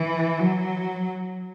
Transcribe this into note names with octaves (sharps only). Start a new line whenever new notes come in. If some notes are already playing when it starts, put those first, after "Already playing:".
Already playing: E3
F#3